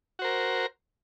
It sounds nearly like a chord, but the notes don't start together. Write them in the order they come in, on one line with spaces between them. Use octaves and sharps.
F#4 C5 A#4